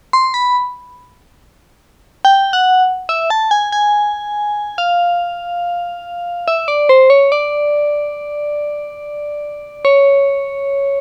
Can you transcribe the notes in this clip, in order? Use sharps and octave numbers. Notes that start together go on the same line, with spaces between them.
C6
B5
G5
F#5
E5
A5
G#5
G#5
F5
E5
D5
C5
C#5
D5
C#5